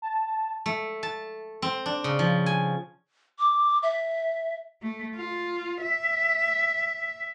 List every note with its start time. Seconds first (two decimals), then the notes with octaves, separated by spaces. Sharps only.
0.02 A5
0.66 A3
1.03 A5
1.62 C4
1.86 D4
2.04 C#3
2.19 F3
2.46 G#5
3.39 D6
3.83 E5
4.82 A3
5.16 F4
5.82 E5